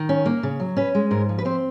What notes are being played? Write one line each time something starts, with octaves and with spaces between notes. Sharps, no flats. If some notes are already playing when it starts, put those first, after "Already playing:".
Already playing: D#3
C#4
A#3
C#3
F#3
C#4 B4
G#3
G#2 A#4
F3
B4
C4 C5